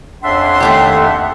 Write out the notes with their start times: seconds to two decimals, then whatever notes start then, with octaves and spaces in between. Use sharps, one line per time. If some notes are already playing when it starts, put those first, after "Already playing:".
0.24 F2 C#3 D4 E5 F#5 C6
0.60 D#2 A3 G4